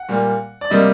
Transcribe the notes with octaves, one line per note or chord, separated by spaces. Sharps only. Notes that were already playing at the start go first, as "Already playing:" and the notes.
Already playing: F#5
A#2 G3 A#3
D5
C3 G3 A#3 D#5